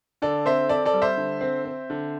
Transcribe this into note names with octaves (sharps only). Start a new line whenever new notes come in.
D3 A4 D5
C4 C5 E5
C4 A4 D5
A4 D5
G3
C5 E5
D3
C4
C4
D3